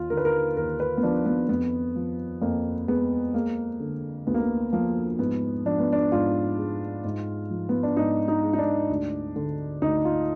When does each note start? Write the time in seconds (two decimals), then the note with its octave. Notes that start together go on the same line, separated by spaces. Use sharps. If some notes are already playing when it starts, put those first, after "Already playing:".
Already playing: D#2 F4
0.10 D3 A#4
0.17 B4
0.25 A#4
0.57 D#2 A#4
0.80 B4
0.97 B3
1.03 F3 D4
1.26 B3
1.49 F2 B3
1.96 F3
2.42 F2 A#3
2.88 G#3 B3
3.34 G#3 A#3
3.80 D3
4.27 D2 B3
4.34 A#3
4.42 B3
4.72 F3 A#3
5.19 G#2 B3
5.66 F3 D4
5.79 B3
5.92 D4
6.12 G#2 F4
6.58 G#3
7.05 G#2
7.50 F3
7.69 B3
7.83 D4
7.97 G#2 D#4
8.28 D#4
8.43 G#3
8.53 D#4
8.58 D4
8.90 D2
9.36 D3
9.82 D2 D#4
10.05 F4